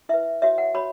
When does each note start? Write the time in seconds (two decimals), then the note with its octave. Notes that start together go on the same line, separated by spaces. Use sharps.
0.09 E4 B4 E5
0.42 F#4 C#5 E5
0.58 F#5
0.74 F#4 C#5 B5